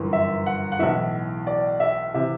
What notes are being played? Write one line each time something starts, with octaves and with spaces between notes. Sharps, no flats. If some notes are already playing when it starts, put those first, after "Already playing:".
Already playing: G1 F#2 E3
E5
F#5
F#5
B1 A2 E3 E5
D5
E5
C3 E3 E5